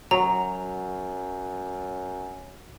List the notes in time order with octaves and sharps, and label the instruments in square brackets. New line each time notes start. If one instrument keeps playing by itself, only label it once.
[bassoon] F#2 [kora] F#3 [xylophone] A#5